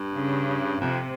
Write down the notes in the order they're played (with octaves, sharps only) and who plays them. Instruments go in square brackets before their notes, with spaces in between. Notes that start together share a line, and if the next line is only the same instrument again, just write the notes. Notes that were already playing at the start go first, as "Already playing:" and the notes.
Already playing: [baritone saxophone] G2
[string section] C#3
[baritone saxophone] F2 [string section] C3